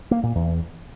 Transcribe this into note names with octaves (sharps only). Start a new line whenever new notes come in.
A#3
A#2
E2